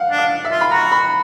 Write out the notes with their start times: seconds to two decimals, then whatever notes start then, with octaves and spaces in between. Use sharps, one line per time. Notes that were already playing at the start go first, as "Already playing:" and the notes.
Already playing: F5 F#5
0.11 D4
0.18 F5
0.45 E5
0.51 F4
0.61 B5
0.71 F#4 A#5
0.92 B5